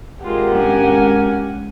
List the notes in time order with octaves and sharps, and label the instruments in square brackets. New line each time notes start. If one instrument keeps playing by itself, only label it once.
[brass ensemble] G#1 A#4 [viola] G#3 F4 [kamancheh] G4 F#5
[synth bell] G#3 [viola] C#4 G#5